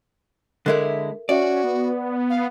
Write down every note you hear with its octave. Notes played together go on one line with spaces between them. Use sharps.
D3 G#3 E4 A4 A#4 E5
C#4 F#4 D5 E5
B3
F5